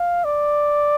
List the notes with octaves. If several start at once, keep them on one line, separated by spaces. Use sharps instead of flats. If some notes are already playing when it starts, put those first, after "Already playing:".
Already playing: F5
D5